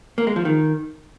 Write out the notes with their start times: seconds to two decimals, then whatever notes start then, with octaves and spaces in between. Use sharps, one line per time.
0.18 A#3
0.27 G#3
0.36 F3
0.45 D#3